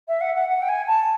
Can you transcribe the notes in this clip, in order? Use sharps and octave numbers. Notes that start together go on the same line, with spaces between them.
E5
F#5
F#5
F#5
G5
G#5
A5